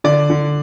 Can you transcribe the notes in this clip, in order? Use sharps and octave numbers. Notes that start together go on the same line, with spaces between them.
D3 D5
D3